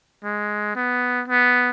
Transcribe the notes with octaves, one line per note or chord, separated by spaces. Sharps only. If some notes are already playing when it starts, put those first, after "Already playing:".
G#3
B3
B3